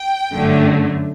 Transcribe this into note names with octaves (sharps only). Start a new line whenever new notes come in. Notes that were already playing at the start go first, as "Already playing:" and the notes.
Already playing: G5
G1 F#2 D3 F#3 A3